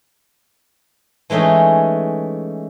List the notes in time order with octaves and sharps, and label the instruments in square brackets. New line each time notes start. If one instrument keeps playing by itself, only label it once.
[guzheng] E3 G#3 A3 C#4 D#4